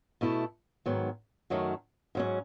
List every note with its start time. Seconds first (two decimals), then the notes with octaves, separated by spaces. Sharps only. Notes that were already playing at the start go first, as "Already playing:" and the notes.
0.21 B2 A3 E4 A4
0.86 G#2 D#3 F#3 B3
1.50 F#2 D#3 F#3 A3
2.15 G#2 F#3 C#4